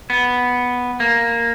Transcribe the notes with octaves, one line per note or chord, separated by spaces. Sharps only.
B3
A#3